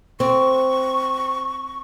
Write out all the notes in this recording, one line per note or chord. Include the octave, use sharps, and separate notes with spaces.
C4 C#6